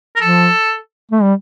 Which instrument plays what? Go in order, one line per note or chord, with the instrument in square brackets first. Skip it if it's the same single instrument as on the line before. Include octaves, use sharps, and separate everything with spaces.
[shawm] A#4
[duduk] F3 [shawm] A4
[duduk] A3
G3